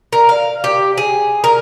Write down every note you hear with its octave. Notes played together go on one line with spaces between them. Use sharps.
A#4
F5
G4
G#4
A#4